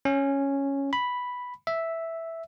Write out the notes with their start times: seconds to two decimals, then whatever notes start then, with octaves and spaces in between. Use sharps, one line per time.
0.05 C#4
0.93 B5
1.67 E5